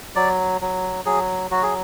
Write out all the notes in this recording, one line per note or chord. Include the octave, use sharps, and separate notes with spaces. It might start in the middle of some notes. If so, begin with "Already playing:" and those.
F#3 D5
F#3
F#3 G#4
F#3 F#4
G#4